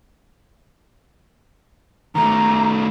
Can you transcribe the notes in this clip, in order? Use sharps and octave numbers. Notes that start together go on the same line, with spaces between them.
D#3 A3 A#5